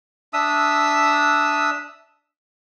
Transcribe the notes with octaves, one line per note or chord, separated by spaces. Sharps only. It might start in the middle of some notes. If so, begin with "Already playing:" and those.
D4 E5 D#6 E6